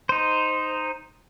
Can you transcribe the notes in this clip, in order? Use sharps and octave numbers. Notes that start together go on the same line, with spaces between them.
D#4 C5